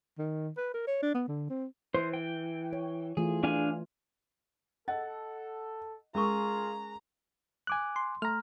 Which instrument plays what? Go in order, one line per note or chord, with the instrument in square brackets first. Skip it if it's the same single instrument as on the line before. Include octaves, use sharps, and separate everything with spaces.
[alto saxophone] D#3
B4
A#4
C#5
D4
B3
D3
C4
[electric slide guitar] E3 [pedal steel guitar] C5
[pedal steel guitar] G5
[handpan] C#5
[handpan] E3 A3 F4 [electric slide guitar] G#4
[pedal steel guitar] D4 F5 G#5
[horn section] A4 [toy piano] D#5 [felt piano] F#5
[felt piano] G#3 [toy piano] C#4 A#4 C#6 [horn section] F4 G#4 G#5 [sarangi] A#5
[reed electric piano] G#5 D6 F#6
[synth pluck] C6
[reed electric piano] A3 A#5 [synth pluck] F6